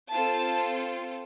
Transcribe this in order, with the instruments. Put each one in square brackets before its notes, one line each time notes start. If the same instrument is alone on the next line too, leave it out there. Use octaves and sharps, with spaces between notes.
[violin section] C4 F4 A4 A5